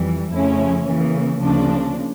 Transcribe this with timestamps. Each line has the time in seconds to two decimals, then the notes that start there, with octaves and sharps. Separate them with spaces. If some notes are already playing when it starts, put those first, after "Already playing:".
Already playing: F2 E3 G3
0.32 F2 C#3 F3 A3 C#4 E4
0.86 C#3 E3 A#3
1.40 D2 C#3 F3 A#3 D4